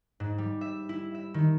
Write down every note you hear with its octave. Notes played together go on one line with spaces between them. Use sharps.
G#2
G3
E5
E4
E5
D#3